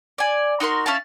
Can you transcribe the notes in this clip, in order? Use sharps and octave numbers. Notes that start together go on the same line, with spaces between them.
D5 G#5
D#4 F#4 A#4 C6
C#4 E4 F5 A5